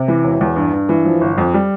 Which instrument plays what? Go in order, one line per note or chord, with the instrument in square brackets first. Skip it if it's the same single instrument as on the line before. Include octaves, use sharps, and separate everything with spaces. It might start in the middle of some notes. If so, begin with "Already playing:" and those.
Already playing: [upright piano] C3
E3
E1
E2
G2
G2
E3
F3
G1
F2
G3